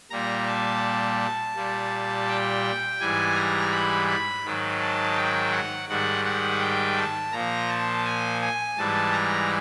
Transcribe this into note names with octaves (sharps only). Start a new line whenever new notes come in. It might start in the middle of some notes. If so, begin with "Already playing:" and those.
A#2 G3 A#5
A5
A#2 G3
G5
G#2 E3 G3 G#5
A#5
B5
B5
G#2 D#3 F#3
A5
G5
F#5
G#2 D#3 G3 F#5
F#5
G5
A5
A#2 F3 A#5
A5
G#5
G#5
G#2 E3 G3 A5
A#5